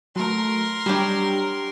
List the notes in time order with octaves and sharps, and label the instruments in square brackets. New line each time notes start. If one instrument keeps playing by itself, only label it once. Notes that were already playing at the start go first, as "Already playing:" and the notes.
[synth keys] F#3 A3 [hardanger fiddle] A#4 C6
[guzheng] F#3 D4 G4 [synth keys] G3 C#5